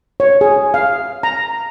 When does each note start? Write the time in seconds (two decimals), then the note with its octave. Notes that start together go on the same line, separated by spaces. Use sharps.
0.20 C#5
0.41 G#4
0.74 F5
1.23 A#5